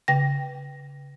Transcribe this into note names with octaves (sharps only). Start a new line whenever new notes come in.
C#3 G5 A#6